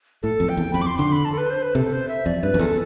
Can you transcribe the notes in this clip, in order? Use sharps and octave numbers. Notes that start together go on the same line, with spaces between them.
A2 A4
F2
G5
E2
F2 B5
D6
C6
D3 C6
B5
A5
A4
B4
C5
B4
C3 A4
C5
E5
F2 D5
G2 B4
F2
E2 A4